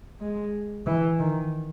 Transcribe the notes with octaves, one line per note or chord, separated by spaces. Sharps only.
G#3
E3
D#3